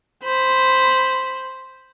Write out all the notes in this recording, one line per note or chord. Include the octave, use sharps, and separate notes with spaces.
C5 B5